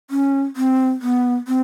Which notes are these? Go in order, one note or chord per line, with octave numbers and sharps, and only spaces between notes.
C#4
C4
B3
C4